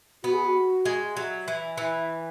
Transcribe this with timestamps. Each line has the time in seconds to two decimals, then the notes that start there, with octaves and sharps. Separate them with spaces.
0.23 B3 F#4
0.34 G#4
0.45 F#4
0.85 G#3
1.17 F#3 E5
1.48 E3
1.78 E3